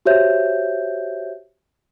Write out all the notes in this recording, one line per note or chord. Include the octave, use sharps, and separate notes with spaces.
F#4 G4 C5 C#5 E5 G6